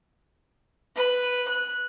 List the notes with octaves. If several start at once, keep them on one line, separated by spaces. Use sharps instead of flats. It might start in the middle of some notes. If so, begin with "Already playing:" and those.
B4
F#6